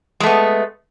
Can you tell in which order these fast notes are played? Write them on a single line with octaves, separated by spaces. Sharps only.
G#3 A3 B3